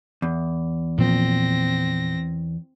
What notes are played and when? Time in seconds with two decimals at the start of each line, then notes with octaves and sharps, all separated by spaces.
0.22 E2
0.98 A#2 F3 C4 A#6